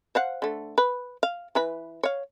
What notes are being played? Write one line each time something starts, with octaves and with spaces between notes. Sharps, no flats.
C5 F5 F#5
D3 A3
B4
F5
E3 B4 B5
C#5 F5